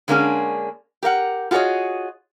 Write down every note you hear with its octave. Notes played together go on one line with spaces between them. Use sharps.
D3 G#3 A#3 C#4 D4 G#4
G4 A#4 F5 F#5
F4 F#4 G#4 A4 C#5 D#5